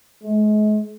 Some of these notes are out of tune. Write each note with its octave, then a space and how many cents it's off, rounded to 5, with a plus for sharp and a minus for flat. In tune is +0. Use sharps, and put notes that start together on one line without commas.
G#3 +40